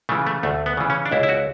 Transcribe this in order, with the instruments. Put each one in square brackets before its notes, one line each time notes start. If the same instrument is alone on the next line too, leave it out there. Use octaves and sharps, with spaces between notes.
[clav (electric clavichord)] C#3 E3 A3
A3
D2 A3
B3
C#3 E3
C#4
D4
C#2 E4
E4
F#4